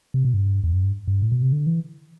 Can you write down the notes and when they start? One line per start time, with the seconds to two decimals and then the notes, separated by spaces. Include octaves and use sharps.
0.14 C3
0.25 B2
0.34 G2
0.64 E2
0.73 F#2
0.83 G2
1.08 G2
1.22 A2
1.32 B2
1.42 C3
1.52 D3
1.67 E3